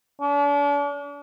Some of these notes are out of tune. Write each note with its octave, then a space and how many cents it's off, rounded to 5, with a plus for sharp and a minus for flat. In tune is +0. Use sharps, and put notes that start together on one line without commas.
D4 -40